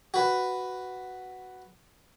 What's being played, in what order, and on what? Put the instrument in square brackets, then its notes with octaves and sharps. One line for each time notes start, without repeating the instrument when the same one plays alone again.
[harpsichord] F#4 B4